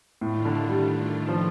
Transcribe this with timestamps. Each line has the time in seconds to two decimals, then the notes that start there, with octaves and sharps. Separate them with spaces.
0.21 A2 D#3 A3 D4 F4
0.45 D3
0.69 G3
1.29 F3